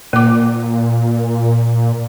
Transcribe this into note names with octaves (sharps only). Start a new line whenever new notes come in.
A#2 A#3 D6